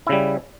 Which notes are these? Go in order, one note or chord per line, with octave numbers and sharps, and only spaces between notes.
C#3 G3 E4